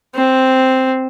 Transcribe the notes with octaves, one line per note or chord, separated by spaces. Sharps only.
C4